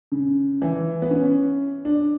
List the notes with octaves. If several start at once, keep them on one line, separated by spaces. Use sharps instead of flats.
C#3
E3
B3
C#4
D4